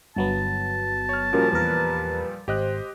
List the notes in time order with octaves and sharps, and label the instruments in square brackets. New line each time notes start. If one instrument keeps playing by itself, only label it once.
[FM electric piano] G1 F#3 B3 [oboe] A5
[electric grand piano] C#5 F6
[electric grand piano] A#2 F3 G3 [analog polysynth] C#4 F#4 A#4
[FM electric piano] E2 A#4 [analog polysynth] B4
[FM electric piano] G#1 [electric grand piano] G4 D#5 F#6 [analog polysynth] C5